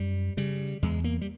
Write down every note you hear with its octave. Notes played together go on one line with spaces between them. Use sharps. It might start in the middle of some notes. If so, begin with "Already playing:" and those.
Already playing: F#2 G3
C#3 G3
E2 G#3
A#3
G3